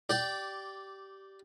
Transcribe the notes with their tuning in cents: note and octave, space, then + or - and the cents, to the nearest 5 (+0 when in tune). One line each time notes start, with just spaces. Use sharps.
G4 -15 D5 +0